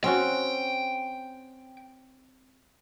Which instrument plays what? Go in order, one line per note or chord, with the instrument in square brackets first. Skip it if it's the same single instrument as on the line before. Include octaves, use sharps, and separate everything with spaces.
[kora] C4 C#4 F#4 [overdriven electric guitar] G5